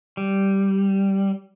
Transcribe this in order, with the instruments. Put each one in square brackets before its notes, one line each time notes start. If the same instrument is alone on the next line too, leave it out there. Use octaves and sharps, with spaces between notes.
[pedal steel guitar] G3